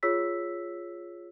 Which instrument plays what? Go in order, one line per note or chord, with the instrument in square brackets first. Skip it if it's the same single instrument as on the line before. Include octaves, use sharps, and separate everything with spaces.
[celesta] F4 G#4 C#5 E6 B6